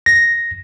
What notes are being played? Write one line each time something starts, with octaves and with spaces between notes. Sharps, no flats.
A#6